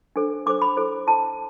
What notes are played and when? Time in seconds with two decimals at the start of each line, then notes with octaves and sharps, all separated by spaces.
0.16 D4 A4 C5
0.46 D4 A4 C5 D6
0.62 B5
0.77 E4 A4 C5
1.07 E4 A4 C5 A5